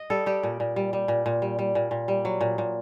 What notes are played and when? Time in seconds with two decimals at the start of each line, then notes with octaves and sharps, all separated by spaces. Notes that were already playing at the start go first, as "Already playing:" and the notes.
Already playing: D#5
0.10 G3 A4
0.26 G3 G4
0.43 A#2
0.60 A#2
0.76 G3
0.93 G3
1.08 A#2
1.26 A#2
1.42 G3
1.59 G3
1.75 A#2
1.91 A#2
2.08 G3
2.25 F#3
2.41 A#2
2.58 A#2